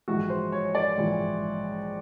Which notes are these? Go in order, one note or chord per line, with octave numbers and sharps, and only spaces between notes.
A#1 G#2 E3 F#4
C5
C#5
D5
A#1 G#2 E3